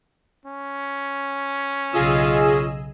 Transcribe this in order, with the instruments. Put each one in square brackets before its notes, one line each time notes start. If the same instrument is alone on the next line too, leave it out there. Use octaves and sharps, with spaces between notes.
[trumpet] C#4
[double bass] B1 C#3 [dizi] F4 [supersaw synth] G#4 D#5 E6